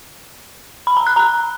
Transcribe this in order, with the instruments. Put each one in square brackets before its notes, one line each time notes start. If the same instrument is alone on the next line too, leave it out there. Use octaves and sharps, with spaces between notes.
[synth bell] B5
A#5
F#6
A#5